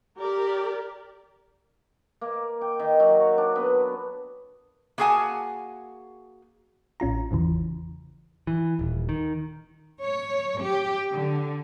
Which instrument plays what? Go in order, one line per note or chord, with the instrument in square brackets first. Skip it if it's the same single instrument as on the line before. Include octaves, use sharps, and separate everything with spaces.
[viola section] G4 A#4 D5
[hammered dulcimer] A#3
G5
D#3
F#3
C#5
D4
B3
[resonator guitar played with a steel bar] A#3 F#4 G#4 F#5 G#5 A5
[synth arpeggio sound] A1 C#4 F4 A#5
G#1 E2 C#3 E3
[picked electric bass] E3
D#1
D#3
[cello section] C#5
G4
D3